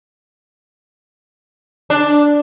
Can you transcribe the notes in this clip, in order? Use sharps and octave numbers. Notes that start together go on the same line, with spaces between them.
D4